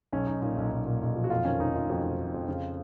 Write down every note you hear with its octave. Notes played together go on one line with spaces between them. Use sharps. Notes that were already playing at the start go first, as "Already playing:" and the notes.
B1 C#4
B1 D#4
A#2 D#4
B1
B1
A#2
B1
F3
F#4
F2 F4
D#3 C#4
F1 D#4
F1 F4
F2 F#4
F1
F1
F2
C#3 F4